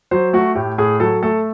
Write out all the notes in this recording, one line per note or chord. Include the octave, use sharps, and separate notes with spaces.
F#3 C5
A3 F#4
A2 G4
A2 G#4
F#3 A4
A3 A4